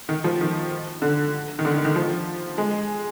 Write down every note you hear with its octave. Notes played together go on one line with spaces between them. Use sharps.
D#3
F3
D#3
D3
D#3
D3
D#3
D#3
F3
G#3